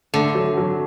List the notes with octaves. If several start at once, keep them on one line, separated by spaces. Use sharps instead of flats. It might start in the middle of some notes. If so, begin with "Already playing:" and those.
D3 A3
F#3
F#3